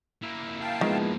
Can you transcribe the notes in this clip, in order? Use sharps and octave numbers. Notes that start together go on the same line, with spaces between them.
A#3 E4
F2
F5 G5 A5
D#3 F3 G#3 B3